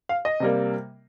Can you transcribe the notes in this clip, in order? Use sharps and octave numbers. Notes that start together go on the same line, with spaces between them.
F5
D#5
C3 G3 A#3